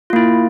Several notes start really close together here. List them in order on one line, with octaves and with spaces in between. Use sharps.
F4 A#3 E4